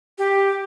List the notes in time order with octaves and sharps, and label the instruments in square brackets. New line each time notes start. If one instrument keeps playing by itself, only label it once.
[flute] G4